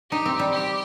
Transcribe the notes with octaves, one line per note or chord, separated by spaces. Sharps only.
D#4 G4
C4
G3
G4